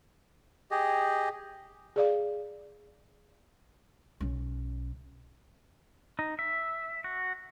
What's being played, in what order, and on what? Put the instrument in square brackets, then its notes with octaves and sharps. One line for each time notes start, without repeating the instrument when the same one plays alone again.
[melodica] G4 G#4 D#5
[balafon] G#4 D5 F5
[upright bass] B1 C#4
[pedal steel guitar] D#4
E5
F#4